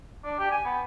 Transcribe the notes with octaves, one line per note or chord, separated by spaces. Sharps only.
D4
G4
G#5
B3